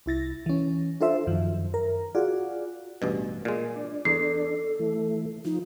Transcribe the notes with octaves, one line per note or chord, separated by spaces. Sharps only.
C2 E4 A6 A#6
E3 C#4
D4 F4 A4 C5 E5
F#2 D#3 F3
A#4
F4 F#4 G#4 D5
A1 G2 B2
A#2 G#3
D4
E2 A4 C7
E3 A3
F3 D#4